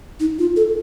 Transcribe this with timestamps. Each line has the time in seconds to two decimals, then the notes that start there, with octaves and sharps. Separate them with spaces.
0.20 D#4
0.39 F4
0.56 A4